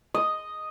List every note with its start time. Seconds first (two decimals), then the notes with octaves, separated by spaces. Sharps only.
0.14 D#5